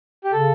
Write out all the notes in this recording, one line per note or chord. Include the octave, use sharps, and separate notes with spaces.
G4
C#3 A4